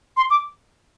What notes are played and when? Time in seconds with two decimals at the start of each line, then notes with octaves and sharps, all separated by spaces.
0.17 C6
0.30 D6